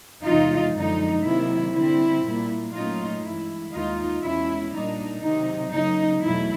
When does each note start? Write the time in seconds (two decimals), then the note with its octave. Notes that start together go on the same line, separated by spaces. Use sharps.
0.24 E2 C3 E3 G#3 D#4 F4
0.75 F#2 D3 F3 G#3 D#4
1.25 C3 D#3 F#3 A#3 E4
1.74 D3 G3 C4 E4
2.24 A#2 G3 A#3
2.74 A#2 F#3 A3 C#4 D#4 F4
3.23 G2 E3 G#3 E4
3.73 D#2 D#3 G#3 D#4 F4
4.23 E2 B2 G#3 C#4 E4
4.73 A#2 G3 A#3 D4 D#4
5.23 C3 D#3 F#3 D#4
5.73 C#3 F#3 A#3 D#4
6.23 E2 B2 F#3 A3 E4